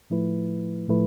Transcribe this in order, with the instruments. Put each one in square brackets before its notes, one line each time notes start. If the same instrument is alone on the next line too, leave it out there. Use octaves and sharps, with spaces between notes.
[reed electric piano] A2 F3 A3 E4 B4
A2 F3 A3 E4 B4